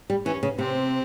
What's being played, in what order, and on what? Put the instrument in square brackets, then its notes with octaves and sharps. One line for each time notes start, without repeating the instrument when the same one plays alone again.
[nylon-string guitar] G3
[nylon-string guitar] E3 [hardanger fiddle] C#4
[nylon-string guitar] C#3
[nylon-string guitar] C3 [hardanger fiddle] C4